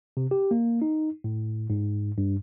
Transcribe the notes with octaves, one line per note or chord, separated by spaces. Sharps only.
C3
G4
A#3
D#4
A2
G#2
G2